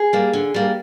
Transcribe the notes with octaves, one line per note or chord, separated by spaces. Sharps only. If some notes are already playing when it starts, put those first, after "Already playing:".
Already playing: G#4
G3 A#3
D3
G3 A#3